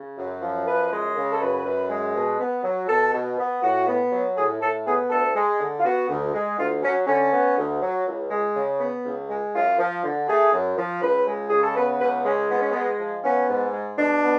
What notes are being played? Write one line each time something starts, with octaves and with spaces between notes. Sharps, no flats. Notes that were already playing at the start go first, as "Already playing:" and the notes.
Already playing: C#3
F#2
F3
F#2 B4
G#3
C#3
A4
F#2 B4
F#2
G#3
B2
B3
F#3
B2 A4
B2
B3
A2 F#4
B3
F#3
A2 G#4
A2 A4
B3 G#4
D2 A4
G#3
D3
F4
B3 F#4
D2
G#3
D2 F4
F#3 C#4
D3 C#4
B3
D2
F#3
C#2
G#3
C#3
B3
C#2
G#3
F#2 F4
F3
D3
A3 G#4
F#2
F3
C#2 B4
G#3
C#3 G#4
A4
B3 B4
C#2 B4
G#3 C#4
G#2 B3
C#4
G#3 B3
F3
B3 C#4
G#2
G#3
B2 D4
B3